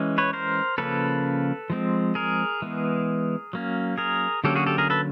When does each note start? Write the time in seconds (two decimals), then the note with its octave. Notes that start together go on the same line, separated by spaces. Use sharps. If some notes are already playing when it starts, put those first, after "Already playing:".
Already playing: E3 G#3 C#4
0.18 B4 C#5
0.33 A#4 C5
0.78 C#3 F3 A#3 C#4 A4 B4
1.70 F3 G#3 C4
2.15 G#4 A#4
2.62 E3 G#3 B3
3.53 F#3 A#3 C#4
3.98 G#4 A#4
4.44 D3 F#3 A#3 C#4 G4 A4
4.56 F#4 G#4
4.66 G4 A4
4.78 G#4 A#4
4.90 A4 B4